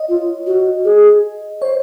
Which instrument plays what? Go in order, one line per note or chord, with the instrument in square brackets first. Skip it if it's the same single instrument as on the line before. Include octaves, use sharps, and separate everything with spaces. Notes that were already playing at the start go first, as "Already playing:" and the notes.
Already playing: [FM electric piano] C#5 D#5
[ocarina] F4
F#4
G#4
[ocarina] C5 [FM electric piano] C#5